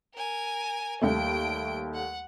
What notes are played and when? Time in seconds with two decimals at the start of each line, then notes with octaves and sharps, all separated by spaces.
0.15 A#4 G#5
1.02 D#2 G3 A3 G5 D7
1.94 F#5